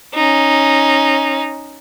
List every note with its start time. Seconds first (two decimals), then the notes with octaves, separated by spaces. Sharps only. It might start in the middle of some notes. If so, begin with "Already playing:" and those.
0.14 C#4 D#4